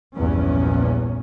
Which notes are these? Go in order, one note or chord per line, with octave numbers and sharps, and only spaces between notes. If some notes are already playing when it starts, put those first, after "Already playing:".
A#1 E2 G2 C#4